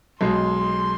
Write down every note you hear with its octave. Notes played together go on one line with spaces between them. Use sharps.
B1 B2 G#3 C6